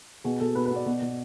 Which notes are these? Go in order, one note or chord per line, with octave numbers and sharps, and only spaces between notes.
B2 G#4
B2 A4
B2 B4
B4
B3
D5
B2
B2